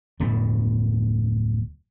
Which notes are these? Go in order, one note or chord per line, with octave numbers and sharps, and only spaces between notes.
D1 F2 B2